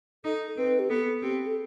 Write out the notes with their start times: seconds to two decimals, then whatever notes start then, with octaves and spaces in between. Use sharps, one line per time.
0.24 D#4 A4
0.57 C4 B4
0.79 G4
0.89 B3 A4
1.22 C4 G4
1.47 A4